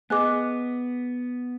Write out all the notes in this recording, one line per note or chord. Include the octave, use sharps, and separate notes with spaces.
B3 G#4 D#5 G#5 D6 F#6